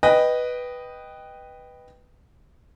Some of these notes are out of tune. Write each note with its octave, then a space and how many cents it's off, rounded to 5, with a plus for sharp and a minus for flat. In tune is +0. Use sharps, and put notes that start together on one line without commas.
B4 +0 D#5 -5 G5 +0